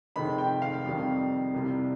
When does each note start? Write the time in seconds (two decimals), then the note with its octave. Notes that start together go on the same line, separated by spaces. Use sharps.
0.16 F1 F2 D#3 G#3 B5
0.38 G5
0.62 F5
0.84 F2 C3 D#3 G3
1.54 C2 C3 G3